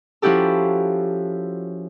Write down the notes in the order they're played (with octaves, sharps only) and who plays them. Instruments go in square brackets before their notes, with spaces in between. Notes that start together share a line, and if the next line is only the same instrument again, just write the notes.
[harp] F3 C#4 E4 F#4 G4 A4